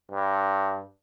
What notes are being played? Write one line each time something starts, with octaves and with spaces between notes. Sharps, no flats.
G2